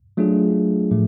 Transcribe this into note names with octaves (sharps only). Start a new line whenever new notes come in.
F#3 A3 D4 F4 G#4
A2 F3 A3